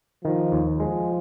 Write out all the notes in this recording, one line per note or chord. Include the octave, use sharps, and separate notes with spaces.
D#3 F3
D#2
F3 G#3